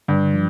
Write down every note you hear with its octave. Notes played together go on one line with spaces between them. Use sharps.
G2 D3
F3